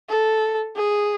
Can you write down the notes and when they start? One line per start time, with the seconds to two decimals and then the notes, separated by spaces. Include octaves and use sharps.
0.09 A4
0.77 G#4